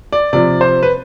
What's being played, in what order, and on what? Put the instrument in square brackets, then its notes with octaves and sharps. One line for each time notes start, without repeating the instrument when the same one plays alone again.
[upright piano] D5
C3 F3 D5
C5
B4